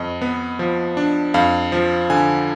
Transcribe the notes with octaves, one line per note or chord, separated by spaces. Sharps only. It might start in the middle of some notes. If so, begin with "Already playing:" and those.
Already playing: F2 D#5
B3
F3
D4
F2 F5
F3
D3 G#5